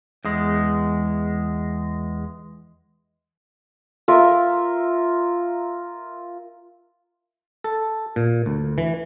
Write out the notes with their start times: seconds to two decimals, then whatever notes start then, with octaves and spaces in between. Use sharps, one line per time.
0.24 E2 G#3
4.08 F4 A#4 E5
7.64 A4
8.16 A#2
8.46 D2
8.78 E3